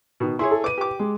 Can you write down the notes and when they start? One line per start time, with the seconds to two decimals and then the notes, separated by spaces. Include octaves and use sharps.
0.20 B2 D#3
0.39 E4 G#4 C#5 C6
0.51 A4
0.64 B4 D6 D#7
0.78 G4 D6
0.99 G#3